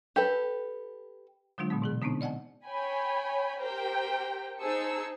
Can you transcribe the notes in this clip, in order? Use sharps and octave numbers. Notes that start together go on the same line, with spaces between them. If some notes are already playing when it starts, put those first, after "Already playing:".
G4 A4 B4
D3 F#3 G#3 D4 F4
A#2 D3 G#3 B3
B2 E3 G#4
D3 B3 C4 D4 D#4
D5 D#5 F#5 G#5 A5
C#5 G5 G#5 B5
G4 A#4 C5 G5
D#4 G#4 C5 A5 E6 C#7